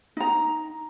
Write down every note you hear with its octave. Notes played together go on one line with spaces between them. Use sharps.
D#4 A#5